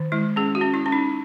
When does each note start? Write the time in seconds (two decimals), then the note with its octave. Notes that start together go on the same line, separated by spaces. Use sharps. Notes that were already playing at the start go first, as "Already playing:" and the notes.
Already playing: D#3
0.12 G#3 E4
0.36 C#4 G#4
0.55 F#4
0.61 C#4
0.74 E4
0.86 C#4
0.92 D#4